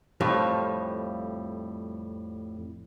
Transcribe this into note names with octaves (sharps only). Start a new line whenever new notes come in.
F2 A2 F3 G3